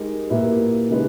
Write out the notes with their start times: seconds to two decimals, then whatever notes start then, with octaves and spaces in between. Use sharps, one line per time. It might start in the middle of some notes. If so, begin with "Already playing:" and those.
Already playing: G#3 D#4 G4 A#4 D#5
0.30 A#2 A#3 E4 G4 B4
0.90 C#3 G#3 D#4 G4 B4